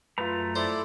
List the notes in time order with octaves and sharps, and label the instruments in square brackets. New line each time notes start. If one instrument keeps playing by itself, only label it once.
[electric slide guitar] F#2 A3 A#5 [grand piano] F4 B4
[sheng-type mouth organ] E4 A4 D5 [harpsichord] C5